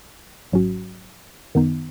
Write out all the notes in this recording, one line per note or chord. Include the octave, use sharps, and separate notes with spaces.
G#1 G#2 F#3 C#4 F#4
F#2 D#3 B3 D#4